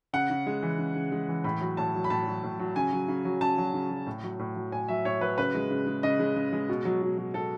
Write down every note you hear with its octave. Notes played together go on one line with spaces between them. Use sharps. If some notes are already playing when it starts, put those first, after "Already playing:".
C#3 F#5
C#3
G#3
E3
C#3
C#3
G#3
E3
A2 B5
F#3
A2 A5
F#3
B5
A2 A5
F#3
A2
F#3
C#3 G#5
F#3
C#3
F#3
C#3 A5
F#3
C#3
F#3
A2
F#3
A2
F#3
A2 G#5
F#3 E5
A2 C#5
F#3 B4
C#3 B4
G#3
C#3
G#3
C#3 D#5
G#3
C#3
G#3
B2
F#3
B2
F#3
B2 A4